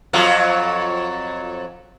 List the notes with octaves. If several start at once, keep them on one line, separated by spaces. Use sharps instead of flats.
F2 F#3 F4